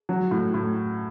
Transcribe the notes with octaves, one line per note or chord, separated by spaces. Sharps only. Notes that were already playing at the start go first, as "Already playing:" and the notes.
F#3
A2
A2